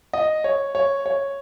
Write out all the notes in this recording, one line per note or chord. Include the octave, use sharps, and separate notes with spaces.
D#5
C#5
C#5
C#5